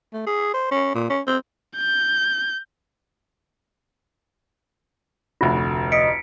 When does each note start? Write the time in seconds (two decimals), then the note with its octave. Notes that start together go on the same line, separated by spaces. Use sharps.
0.14 A3
0.27 G#4
0.54 C5
0.71 C#4
0.95 A#2
1.10 C#4
1.27 C4
1.77 G6
5.41 F1 D2 F4 F#4
5.92 D#5 B6 C#7 D7